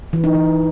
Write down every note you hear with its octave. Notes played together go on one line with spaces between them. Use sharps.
E3
D#4
E3